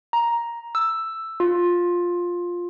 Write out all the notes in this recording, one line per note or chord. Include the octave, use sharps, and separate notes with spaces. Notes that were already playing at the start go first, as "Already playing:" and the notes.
A#5
E6
F4